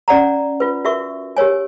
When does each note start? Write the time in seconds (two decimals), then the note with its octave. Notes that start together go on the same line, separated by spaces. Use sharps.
0.08 C#4 D5 F#5 A#5
0.60 F4 B4
0.85 F#4 A#4 E5 C#6
1.37 G4 A#4 C#5 G#5